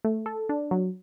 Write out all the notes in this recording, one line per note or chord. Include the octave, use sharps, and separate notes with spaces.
A3
A4
D4
F#3